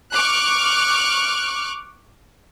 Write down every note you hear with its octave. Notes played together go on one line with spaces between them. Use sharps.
C#6 D6 F6 F#6